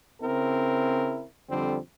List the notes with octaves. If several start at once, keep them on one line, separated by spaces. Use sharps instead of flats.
C#3 C4 E4 A#4
F2 D3 G3 C4